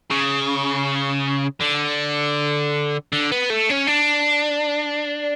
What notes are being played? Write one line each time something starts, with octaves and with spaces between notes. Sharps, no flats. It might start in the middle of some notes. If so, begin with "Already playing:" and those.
C#3
D3
D3
B3
A3
C#4
D4